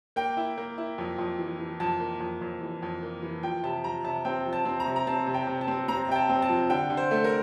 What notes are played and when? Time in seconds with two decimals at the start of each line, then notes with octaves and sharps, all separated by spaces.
0.16 A#3 G5
0.37 E4
0.58 A#3
0.78 E4
0.98 F2
1.18 F2
1.39 E3
1.59 E3
1.80 F2 A5
2.00 A#3
2.20 F2
2.41 F2
2.61 E3
2.83 F2
3.03 A#3
3.22 E3
3.43 F3 G5
3.63 C3 A5
3.84 F3 A#5
4.04 C3 A5
4.25 C4 G5
4.46 F3
4.53 A5
4.65 C4
4.80 A#5
4.86 C3
4.96 A#5
5.07 C4 A5
5.27 C3
5.34 G5
5.47 C3
5.61 A5
5.68 C4
5.88 C4 A#5
6.09 C3 G5
6.15 A5
6.29 C4
6.42 A5
6.49 F3
6.70 D3 G5
6.90 D3
6.97 C5
7.11 A3
7.24 A#4